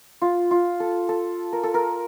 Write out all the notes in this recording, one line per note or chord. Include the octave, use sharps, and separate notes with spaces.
F4
F4
A4
A4
A#4
A4
A#4